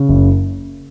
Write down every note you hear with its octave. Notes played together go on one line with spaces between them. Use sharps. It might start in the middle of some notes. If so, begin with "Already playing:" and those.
Already playing: C#3
F#1